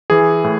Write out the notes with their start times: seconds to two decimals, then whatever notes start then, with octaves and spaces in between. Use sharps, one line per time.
0.10 E3 G#4
0.44 A2